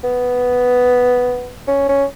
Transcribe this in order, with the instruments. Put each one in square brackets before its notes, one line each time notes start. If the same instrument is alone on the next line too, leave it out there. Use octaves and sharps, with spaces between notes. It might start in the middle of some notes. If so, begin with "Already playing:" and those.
[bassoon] B3
C#4
C#4